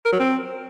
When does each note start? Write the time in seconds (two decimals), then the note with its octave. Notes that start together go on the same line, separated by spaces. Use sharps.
0.05 A#4
0.12 F#3
0.20 C4